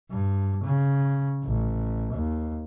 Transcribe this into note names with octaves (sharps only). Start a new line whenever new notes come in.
G2
C#3
A1
D#2